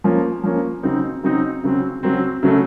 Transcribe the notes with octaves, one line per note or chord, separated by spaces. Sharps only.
F3 A#3 C#4
F3 A#3 C#4
C#3 F#3 C4 D#4
C#3 F#3 C4 D#4
C#3 F#3 C4
C#3 F#3 C4
C#3 F#3 A3